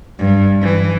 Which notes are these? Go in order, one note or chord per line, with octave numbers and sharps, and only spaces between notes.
G2
E3